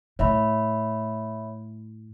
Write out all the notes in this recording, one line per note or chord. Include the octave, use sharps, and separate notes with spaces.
A2 C#5 E5 B5